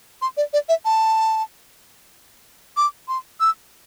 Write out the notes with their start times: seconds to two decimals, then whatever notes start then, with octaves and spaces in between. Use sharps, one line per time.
0.22 C6
0.37 D5
0.53 D5
0.69 E5
0.85 A5
2.77 D6
3.08 C6
3.40 E6